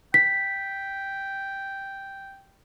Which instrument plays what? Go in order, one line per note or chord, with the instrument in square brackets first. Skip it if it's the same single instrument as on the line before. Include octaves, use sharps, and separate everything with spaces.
[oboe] G5 [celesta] B6